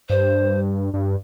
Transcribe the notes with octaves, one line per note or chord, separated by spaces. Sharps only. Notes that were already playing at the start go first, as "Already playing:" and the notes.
G2 C5
G2